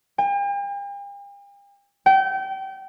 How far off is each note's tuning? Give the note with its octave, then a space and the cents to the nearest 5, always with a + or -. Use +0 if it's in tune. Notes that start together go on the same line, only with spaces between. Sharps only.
G5 +45
G5 -30